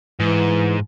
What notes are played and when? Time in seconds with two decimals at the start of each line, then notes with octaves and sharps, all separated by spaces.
0.20 G#2 E3